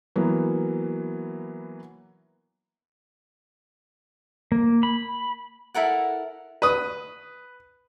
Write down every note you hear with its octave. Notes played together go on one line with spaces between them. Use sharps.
E3 F#3 A#3 B3
A#3
B5
E4 A4 A#4 F#5
B4 D#6